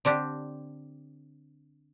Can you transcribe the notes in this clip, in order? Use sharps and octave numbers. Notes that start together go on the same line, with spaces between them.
D3 C4 D4 G4